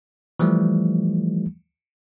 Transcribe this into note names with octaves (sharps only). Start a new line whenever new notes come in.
E3 F3 G3 A3